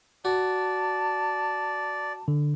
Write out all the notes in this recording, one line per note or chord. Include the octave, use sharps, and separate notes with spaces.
F#4 D5 A5
D3